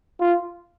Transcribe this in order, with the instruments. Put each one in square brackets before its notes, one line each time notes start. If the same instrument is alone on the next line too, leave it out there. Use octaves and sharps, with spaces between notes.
[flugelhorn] F4